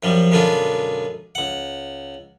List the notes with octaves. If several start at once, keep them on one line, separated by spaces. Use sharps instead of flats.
F#2 F3 G3
F#2 B2 D3 G#3 D4 F4
C#2 F#5